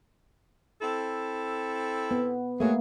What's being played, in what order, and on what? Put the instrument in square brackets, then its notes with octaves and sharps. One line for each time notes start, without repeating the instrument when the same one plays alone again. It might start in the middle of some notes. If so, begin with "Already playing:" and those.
[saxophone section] C4 E4 A4
[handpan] B3
[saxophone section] F#3 G#4 [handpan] A3 A#3